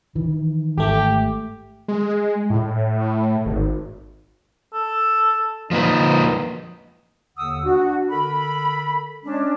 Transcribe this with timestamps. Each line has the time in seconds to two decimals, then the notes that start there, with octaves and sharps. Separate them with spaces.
0.15 D#3 E3
0.78 G#1 A3 G4
1.88 G#3
2.50 A2
2.99 A2
3.46 G#1
4.73 A4
5.71 F3 A#3 D#4 B4
7.37 D#2 D3 F#5 D#6 E6
7.64 D4 F#4
8.09 D3 A4 A#4 B5
9.24 G#3 C#4 D4